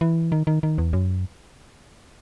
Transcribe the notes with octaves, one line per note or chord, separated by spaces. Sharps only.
E3
D#3
D#3
D#3
E2
F#2